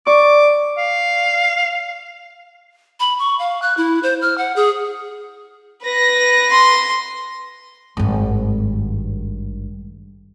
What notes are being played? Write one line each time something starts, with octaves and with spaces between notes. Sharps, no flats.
D5 C#6 D6
F5
B5
C#6
F5
F#6
E4
C5
F6
F#5
G#4
B4 A#6
C6
G#1 G2